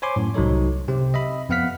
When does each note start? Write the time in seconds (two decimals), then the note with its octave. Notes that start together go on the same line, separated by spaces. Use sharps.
0.02 C5 C#5 G#5 B5 C6 D6
0.16 F#2 A2
0.34 C2 F#3 D#4 A4 C#5
0.88 C3 C4 G4
1.14 D#5 E5 B5
1.49 F2 B3 F5 F#5 F6 B6